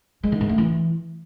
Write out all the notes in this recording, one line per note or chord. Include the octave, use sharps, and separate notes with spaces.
G#3
D#3
G#2
A3
E3